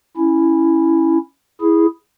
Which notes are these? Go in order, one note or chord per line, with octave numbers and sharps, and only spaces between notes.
C#4 E4
E4 G#4